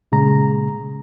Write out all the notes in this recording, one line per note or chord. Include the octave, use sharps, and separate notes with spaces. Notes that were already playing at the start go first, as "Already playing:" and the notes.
A#2 C#3 G#3 A#5